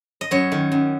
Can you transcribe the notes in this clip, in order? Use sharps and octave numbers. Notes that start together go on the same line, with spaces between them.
D#5
F#2 C#5
D#3
F#2